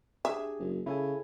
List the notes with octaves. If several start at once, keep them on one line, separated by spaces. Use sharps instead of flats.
D4 G4 G#4 E5
F#1
C#3 E4 A4 G#5